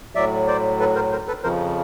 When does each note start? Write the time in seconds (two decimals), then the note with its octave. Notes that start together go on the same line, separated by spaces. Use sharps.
0.15 A2 F#3 D5 E5
0.47 C5 D5
0.80 A4 B4
0.95 A#4 C5
1.12 A#4 C5
1.28 A4 B4
1.43 F2 C#3 F3 A#4 C5